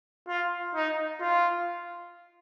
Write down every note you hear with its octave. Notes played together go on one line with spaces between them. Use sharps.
F4
D#4
F4